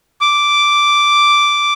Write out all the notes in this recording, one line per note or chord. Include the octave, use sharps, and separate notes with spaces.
D6